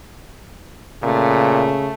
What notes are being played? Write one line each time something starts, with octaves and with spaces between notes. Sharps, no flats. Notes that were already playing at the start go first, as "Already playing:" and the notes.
A#2 C#3 A3